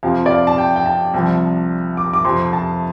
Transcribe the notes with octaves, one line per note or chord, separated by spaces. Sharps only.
F2 C3 F3 F5
D5
F5
A5
G5
G5
A5
C2 C3 F3
D6
D6
F2 C3 F3 C6
A5